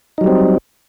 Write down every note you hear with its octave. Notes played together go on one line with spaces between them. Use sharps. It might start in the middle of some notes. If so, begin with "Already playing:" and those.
F#3 G3 C4 D#4